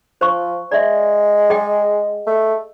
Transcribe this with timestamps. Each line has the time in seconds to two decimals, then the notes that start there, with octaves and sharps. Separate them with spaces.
0.21 F3 C5 C#6
0.71 G#3 D5 E5
1.50 G#4 D#5 G5
2.27 A3